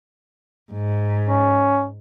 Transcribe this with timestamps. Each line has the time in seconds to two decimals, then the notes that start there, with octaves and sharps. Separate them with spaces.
0.72 G#2
1.28 C#4